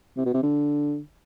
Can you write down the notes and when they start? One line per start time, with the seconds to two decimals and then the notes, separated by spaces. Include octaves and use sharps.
0.17 C3
0.25 B2
0.34 C3
0.43 D3